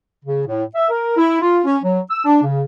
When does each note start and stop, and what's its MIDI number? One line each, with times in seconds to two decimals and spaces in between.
0.24 0.42 49
0.47 0.64 45
0.75 0.88 76
0.90 1.15 70
1.17 1.40 64
1.41 1.59 65
1.65 1.77 61
1.84 2.00 54
2.11 2.25 88
2.25 2.41 62
2.43 2.64 49